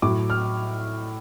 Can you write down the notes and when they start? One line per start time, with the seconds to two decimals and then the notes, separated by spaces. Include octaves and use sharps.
0.02 A2 F#3 D6
0.30 F6